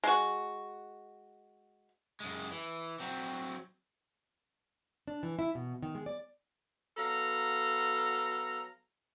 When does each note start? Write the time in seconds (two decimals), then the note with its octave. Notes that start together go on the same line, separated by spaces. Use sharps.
0.04 G#3 F#4
2.20 F#2 G#3
2.51 E3
3.00 F#3 C4
5.08 D4
5.23 E3
5.39 E4
5.55 B2
5.82 D#3
5.95 G#3
6.06 D5
6.97 F#3 B3 A4 F5 A#5